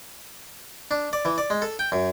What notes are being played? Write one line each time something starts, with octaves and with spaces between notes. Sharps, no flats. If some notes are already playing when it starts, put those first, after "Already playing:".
D4
D5
E3
D5
G#3
A4
G5
F#2